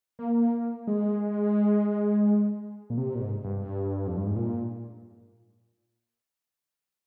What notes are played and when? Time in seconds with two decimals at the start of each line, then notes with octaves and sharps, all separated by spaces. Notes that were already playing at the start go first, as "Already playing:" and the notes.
0.19 A#3
0.87 G#3
2.90 A#2
2.97 C3
3.15 A#2
3.20 G#2
3.44 G2
4.07 F2
4.17 G2
4.27 G#2
4.36 A#2